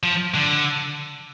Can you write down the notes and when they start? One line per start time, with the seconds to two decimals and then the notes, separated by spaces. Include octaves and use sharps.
0.03 F3
0.35 D3